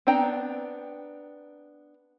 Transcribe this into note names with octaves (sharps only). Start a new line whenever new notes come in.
B3 C4 D4 G5 A#5